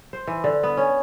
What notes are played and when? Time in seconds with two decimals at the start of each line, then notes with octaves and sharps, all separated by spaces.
0.13 C5
0.27 E3
0.44 D3
0.63 B3
0.77 C#4